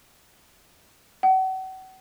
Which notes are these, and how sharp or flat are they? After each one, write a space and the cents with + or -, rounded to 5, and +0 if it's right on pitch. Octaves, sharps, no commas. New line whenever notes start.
F#5 +40